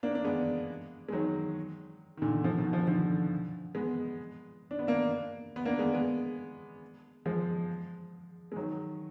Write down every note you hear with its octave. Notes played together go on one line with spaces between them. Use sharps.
A#3 D4
D4
G#3 B3
G#3
D#3 F#3
D#3
A#2 D3
D3 F3
B2 D#3
D3 F3
D#3
D3 F3
G#3 B3
D4
B3
A#3 D4
B3
A#3 D4
G#3 B3
G#3 B3
F3 G#3
G#3
D#3 F#3